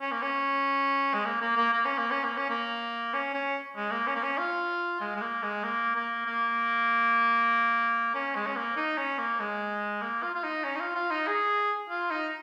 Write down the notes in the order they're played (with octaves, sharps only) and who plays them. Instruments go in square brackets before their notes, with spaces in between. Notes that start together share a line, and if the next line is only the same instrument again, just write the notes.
[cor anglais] C#4
A#3
C#4
G#3
A#3
A#3
A#3
A#3
C#4
A#3
C#4
A#3
C#4
A#3
C#4
C#4
G#3
A#3
C#4
A#3
C#4
F4
G#3
G#3
A#3
G#3
A#3
A#3
A#3
C#4
G#3
C#4
A#3
D#4
C#4
A#3
G#3
A#3
F4
F4
D#4
C#4
D#4
F4
F4
D#4
G#4
F4
D#4